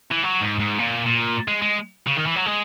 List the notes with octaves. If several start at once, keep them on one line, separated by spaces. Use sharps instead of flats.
E3
F#3
G#2
G#2
A#2
A#2
G#3
G#3
C#3
D#3
E3
F#3
G#3